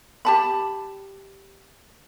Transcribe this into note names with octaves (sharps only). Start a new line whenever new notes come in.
G4 A5 B5